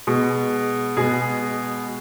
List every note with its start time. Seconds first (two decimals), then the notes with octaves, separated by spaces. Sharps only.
0.07 B2 G#3
0.97 B2 G#3 G#4